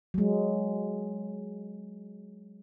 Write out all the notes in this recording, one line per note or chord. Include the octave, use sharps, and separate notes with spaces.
F#3 G#3